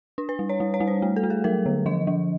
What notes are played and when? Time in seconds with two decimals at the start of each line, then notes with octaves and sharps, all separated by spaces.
0.18 D4
0.29 B4
0.39 G3
0.49 C#5
0.60 G3
0.74 C#5
0.80 G3
0.87 C5
1.02 A3
1.16 A4
1.23 A3
1.30 G#4
1.44 F#3 A#4
1.66 D3
1.86 F3 D#5
2.07 F3